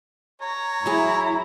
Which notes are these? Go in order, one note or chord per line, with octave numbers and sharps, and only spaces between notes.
C#5 A#5
F#3 E4 G#4 A#5